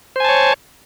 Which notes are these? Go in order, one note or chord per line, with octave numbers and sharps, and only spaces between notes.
C5 C#5 G#5 A5